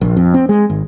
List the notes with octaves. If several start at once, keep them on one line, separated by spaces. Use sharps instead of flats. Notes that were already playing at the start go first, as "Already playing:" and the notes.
A#1
F2
C4
G#3
G#1